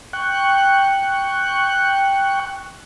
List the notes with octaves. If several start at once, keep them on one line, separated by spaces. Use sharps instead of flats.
G5 C#6 F#6